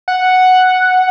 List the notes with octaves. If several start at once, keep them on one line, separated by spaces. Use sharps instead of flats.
F#5